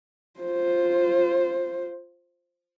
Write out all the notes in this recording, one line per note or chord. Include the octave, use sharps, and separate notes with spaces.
F4 C5